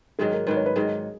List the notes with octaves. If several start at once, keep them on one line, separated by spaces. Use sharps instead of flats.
G#2 D#3 F#3 G#4
A#4
G#2 D#3 F#3 B4
C#5
B4
G#2 D#3 F#3 G#4